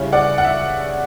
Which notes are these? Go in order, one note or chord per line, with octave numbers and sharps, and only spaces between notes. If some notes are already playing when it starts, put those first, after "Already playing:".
Already playing: C#3 G3 C#4 E4
D5 F#5
F#5
E5